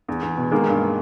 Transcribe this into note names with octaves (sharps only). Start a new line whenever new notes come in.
E2
E2
B2
D#3 G#3 A#3
G2